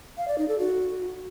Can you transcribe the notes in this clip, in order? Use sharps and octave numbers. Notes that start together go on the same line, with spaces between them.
F5
D5
D#4
A4
F#4